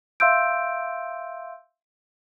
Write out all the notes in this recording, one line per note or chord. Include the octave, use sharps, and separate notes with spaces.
E5 F5 C6 E6 G6 D7